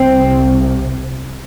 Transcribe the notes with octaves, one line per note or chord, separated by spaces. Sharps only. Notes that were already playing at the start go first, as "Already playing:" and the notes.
Already playing: C2 C3 C4